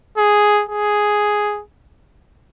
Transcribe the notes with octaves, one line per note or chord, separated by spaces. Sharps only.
G#4
G#4